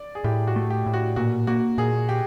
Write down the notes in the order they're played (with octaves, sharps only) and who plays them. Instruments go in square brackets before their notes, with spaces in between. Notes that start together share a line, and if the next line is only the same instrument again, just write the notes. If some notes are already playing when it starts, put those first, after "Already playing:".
Already playing: [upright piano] D5
G#4
[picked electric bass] A2 [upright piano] G4
[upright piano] F#4
[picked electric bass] A3
[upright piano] G4
[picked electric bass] A2
[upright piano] F#4
[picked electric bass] A#2 [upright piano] F#4
[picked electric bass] A#3 [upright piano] F#4
[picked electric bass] A#2 [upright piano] G#4
[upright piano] G4